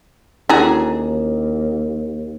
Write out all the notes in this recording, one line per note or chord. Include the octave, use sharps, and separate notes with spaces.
D#2 D3 C#4 E4 F#4 G#4 A#5